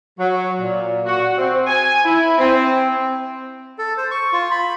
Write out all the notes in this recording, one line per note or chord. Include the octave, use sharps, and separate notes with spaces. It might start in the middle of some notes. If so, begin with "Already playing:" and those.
F#3
A#2
F#4
C4
G#5
E4
C4
A4
C5
C#6
F4
B5